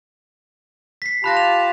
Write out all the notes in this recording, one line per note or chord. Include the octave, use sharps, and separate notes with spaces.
B6 C7
F4 G4 A5 B5 F#6 A#6
F7